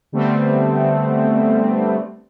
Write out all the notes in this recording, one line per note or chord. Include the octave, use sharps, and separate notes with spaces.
D3 G3 A3 B3 C4